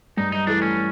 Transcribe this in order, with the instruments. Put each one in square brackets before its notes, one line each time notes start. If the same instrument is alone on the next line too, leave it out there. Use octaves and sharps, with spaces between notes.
[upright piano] G2 [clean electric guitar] D#4
[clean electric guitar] D#4
[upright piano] E3 A3 [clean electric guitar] D4
[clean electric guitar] C#4